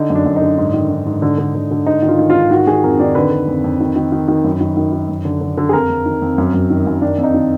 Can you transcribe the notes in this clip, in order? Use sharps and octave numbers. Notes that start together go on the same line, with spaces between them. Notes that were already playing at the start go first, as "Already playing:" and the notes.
Already playing: D3 D#4
F#2
D4
F#2
D#4
D3
G#2
D#3
G#2
G#2
D3
D3
D3
D3
G#2 D#4
D#3
F4
D#3
F4
G#2
D#3 F#4
D#3 G#4
F2 A#4
D#3 D5
D3 B4
D3
F2
F2
D#3
D#3
D#3
D#3
F#2
D#3
D#3
D#3
F#2
D3
D3
D3
G#4
F2 A#4
F2
D#3
F2
F#2
F#2
D#3
F#2
D#3 D4
F2
D#4
D#3